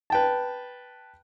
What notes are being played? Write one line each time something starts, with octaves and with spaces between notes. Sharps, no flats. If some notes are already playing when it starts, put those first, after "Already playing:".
B4 G5 A5